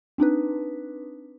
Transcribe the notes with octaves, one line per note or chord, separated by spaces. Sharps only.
C4 D4 D#4 B4